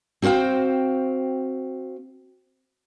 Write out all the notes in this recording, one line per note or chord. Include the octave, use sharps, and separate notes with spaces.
C4 F#4 C5 F5 G5